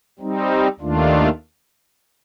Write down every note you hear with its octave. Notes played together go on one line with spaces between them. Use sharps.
G3 C4 D#4
D#2 D#3 A3 D4 F4